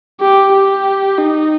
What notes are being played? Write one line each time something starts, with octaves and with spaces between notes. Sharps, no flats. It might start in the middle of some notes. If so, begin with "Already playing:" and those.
G4
G4
D#4